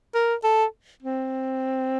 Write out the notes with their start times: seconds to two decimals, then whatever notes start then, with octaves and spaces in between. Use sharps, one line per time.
0.14 A#4
0.44 A4
1.03 C4